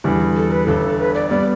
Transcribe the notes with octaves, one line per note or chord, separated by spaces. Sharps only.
E2 D3 G3 E4
A4
B4
G1 G2 D3 A4
B4
D5
G3 B3 D5